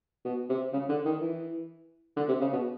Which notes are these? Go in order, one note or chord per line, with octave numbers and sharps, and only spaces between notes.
B2
C3
C#3
D3
D#3
E3
D3
C3
C#3
B2